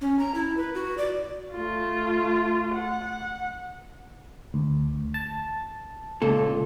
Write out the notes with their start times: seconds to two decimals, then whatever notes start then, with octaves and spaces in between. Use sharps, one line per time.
0.01 C#4
0.19 A#5
0.35 E4
0.57 B4
0.75 F#4
0.98 D5
1.53 A3 F4
2.75 F#5
4.54 D2
5.14 A5
6.22 C#2 A#2 A4